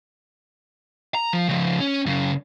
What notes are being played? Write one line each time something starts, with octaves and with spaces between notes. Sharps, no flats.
A#5
F3
C#3 F3
C#4
F#2 C#3